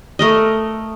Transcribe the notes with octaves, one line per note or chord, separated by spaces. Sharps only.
A3 A#4 D#5